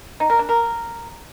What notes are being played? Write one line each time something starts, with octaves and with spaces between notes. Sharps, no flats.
D#4
A#4
D4
A#4